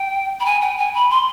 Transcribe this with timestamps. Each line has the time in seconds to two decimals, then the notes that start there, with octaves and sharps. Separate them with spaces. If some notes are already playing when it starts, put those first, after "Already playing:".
Already playing: G5
0.40 B5
0.45 G#5
0.62 G5
0.78 G#5
0.94 B5
1.10 C6